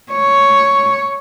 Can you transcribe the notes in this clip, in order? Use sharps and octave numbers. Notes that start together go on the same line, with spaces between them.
C#5